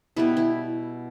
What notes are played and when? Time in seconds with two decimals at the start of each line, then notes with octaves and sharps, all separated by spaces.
0.16 B2 G3 B3 E4
0.37 E4